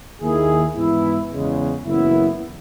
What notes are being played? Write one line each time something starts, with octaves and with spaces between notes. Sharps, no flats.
D#2 D#3 A#3 E4 G#4
G#2 E3 B3 E4
E2 C#3 G#3
F#1 F#2 E3 B3 E4